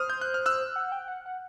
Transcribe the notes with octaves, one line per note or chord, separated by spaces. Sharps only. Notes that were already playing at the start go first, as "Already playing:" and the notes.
Already playing: C5 D#6 F6
G6
F#6
F6
E6 F#6
F#5
G5
F#5
F#5